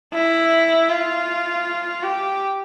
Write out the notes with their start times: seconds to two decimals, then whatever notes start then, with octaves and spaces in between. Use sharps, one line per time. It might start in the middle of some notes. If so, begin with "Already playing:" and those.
0.14 E4
0.90 F4
2.03 G4